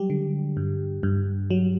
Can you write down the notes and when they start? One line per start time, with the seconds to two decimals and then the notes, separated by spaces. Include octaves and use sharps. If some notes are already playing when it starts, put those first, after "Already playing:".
Already playing: F#3 G3 G4
0.10 D3
0.57 G2
1.03 G2
1.50 F#3